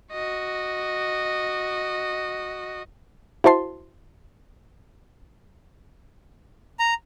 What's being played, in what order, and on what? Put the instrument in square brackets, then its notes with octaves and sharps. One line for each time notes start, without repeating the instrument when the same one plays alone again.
[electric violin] F#4 D#5
[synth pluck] E4 F#4 C5 A5 C6
[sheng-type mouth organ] A#5